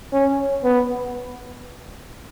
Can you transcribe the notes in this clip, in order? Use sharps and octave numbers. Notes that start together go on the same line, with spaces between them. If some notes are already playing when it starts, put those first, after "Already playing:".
C#4
B3